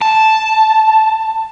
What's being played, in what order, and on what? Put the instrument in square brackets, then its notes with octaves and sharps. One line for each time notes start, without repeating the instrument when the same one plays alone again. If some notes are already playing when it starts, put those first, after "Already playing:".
[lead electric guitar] A5